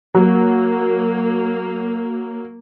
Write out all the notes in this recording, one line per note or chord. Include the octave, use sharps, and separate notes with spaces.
F#3 A#3